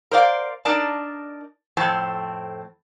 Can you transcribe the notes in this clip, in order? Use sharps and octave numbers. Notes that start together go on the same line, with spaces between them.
A#4 C5 D5 F5
D4 D#4 A#4 D5 A5
F2 A2 C4 A5